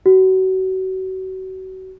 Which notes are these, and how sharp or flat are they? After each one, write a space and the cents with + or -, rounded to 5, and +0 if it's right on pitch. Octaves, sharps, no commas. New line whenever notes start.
F#4 +30